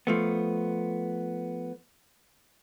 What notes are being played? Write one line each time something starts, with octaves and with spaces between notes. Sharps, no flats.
F3 A3 B3